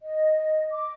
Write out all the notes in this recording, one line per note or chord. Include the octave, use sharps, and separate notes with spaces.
D#5
D6